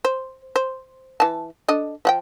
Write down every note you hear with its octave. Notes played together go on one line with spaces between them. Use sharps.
C5
C5
E3 A5
D4 A4 D#5
F3 F#5 G5